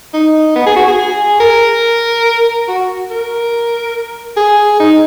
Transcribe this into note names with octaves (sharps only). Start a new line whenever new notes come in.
D#4
B3
G#4
F#4
G#4
A#4
F#4
A#4
G#4
D#4